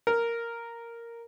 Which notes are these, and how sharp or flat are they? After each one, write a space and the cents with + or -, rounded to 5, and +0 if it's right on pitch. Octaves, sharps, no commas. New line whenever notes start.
A#4 -5